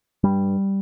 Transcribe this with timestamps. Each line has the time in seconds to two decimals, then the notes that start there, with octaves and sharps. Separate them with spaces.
0.24 G2 G3